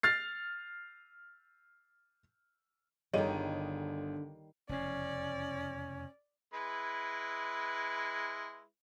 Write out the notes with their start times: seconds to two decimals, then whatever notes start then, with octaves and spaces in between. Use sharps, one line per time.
0.03 F6 A6 C7
3.14 G1 D3 D#3 G3 G#4 C#5 D#5 D#7
4.69 F1 E2 C#3 C#4 D5
6.54 G#3 E4 B4